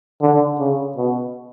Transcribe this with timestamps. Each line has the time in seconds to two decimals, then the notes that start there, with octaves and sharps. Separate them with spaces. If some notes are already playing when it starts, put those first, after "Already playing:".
0.21 D3
0.59 C#3
0.97 B2